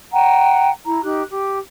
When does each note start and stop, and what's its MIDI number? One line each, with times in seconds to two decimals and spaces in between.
0.13 0.70 78
0.13 0.70 79
0.13 0.70 82
0.84 1.01 64
0.84 1.01 82
1.03 1.22 63
1.03 1.22 67
1.03 1.22 90
1.31 1.59 67